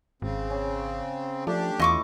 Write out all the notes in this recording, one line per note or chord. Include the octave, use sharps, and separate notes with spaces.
G#1 C#3 C4
C#4
F3 A3 D4 G4
E2 E4 F4 D#5 C#6 D6